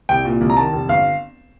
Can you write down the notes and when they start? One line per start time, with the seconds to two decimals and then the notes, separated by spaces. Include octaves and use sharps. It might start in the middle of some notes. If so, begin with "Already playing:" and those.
0.09 C2 G5
0.25 A#2
0.41 C2
0.50 A#5
0.57 D#3 A5
0.73 F1
0.89 G1 F5